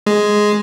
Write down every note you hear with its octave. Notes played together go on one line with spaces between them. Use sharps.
G#3